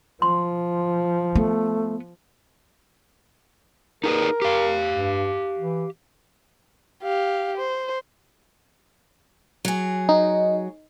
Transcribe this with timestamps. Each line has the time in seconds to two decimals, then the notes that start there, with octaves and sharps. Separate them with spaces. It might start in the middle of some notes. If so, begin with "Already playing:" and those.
0.22 F3 C6
1.35 A3 B3
4.04 D#4 G#4 A#4 B4
4.42 G4 F5
4.90 G2
5.58 E3
7.03 G4 F5
7.57 C5
9.65 F#3 G#4
10.09 D#4